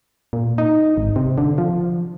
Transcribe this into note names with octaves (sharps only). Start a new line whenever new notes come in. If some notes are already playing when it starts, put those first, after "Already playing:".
A#2
D#4
G#1
C3
D3
F3